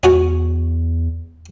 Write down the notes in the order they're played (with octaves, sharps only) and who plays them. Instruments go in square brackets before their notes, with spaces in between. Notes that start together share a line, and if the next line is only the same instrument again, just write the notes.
[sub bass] E2 [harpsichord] C#4 F#4 C#5